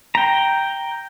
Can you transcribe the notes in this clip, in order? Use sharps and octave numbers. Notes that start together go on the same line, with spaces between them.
G5 A#5